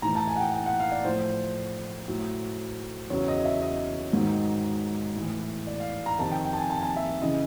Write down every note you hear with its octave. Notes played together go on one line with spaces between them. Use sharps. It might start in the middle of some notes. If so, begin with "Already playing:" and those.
A2 E3 A#5
A5
G#5
F#5
G5
G5
F#5
F5
D5
A2 F3 C5
A2 F#3
E2 C#3 F#3 C#5
D#5
E5
D#5
G#2 D#3 F#3
A2 E3
D5
F5
A#5
F2 C3 D#3 A5
G5
G5
A5
G#5
A5
G#5
A5
E5
C#3 E3 D#5